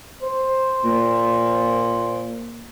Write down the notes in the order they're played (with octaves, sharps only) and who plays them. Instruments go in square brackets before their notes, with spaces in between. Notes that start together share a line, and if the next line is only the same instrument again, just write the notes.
[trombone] C5
[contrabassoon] A#2